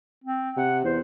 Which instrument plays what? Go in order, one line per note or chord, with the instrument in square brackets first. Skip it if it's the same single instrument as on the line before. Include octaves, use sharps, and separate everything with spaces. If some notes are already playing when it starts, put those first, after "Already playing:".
[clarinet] C4
[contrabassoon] C3 [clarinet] F#5
[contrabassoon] E2 [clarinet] C5